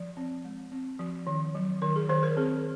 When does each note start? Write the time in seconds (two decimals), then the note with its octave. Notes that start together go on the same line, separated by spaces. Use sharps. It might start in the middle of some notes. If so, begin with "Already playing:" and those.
Already playing: F3
0.17 C4
0.45 G#3
0.72 C4
0.99 F3
1.27 D#3
1.55 F#3
1.82 D#3 A#4
1.96 G#4
2.09 D#3 C5
2.23 A#4
2.37 C4 G#4